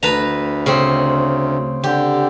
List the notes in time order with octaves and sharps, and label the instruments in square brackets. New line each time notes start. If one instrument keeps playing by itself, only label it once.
[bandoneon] D2 [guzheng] B4 A5 A#5
[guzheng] C#3 C4
[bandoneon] D3 [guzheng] G4